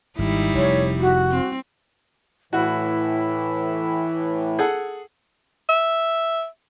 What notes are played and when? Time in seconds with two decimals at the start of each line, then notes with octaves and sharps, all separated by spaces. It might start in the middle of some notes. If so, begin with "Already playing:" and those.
0.19 G#1 G3 D#4 E4
0.55 F1 C3 C#5
1.00 F#4
1.31 C4
2.53 A2 E3 E4 F#4
4.59 G#4 A4 F#5
5.69 E5